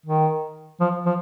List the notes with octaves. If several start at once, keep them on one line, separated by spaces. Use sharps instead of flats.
D#3
F3
F3